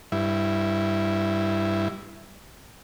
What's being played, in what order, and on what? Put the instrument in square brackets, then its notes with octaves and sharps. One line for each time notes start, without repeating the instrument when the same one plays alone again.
[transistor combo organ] G2 E4